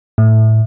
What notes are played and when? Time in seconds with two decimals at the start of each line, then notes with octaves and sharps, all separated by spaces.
0.18 A2